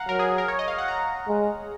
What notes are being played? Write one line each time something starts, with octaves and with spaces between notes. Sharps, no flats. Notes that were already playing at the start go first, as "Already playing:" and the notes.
Already playing: F5 F#5 A#5
F#3 A#4
G#4
A#4
C#5
D#5
F5
F#5
A#5
G#3